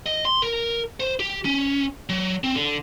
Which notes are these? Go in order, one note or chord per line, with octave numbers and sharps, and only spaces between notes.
D#5
C6
A#4
C5
G4
C#4
F#3
C4
D3